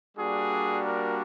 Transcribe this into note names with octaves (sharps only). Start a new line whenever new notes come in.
G3 A#3 D4 F#4 G#4
A#4